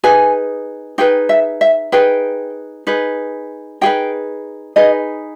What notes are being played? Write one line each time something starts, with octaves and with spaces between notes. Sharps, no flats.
D#4 G#4 B4 G#5
D#4 G#4 B4 G5
E5
E5
D#4 G#4 B4 G5
D#4 G#4 B4
D#4 G#4 B4 G5
D#4 G#4 B4 D#5